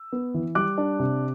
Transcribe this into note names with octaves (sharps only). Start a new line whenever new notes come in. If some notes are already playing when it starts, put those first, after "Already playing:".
Already playing: E6
B3
E3
G3 D6 F#6
D4
C3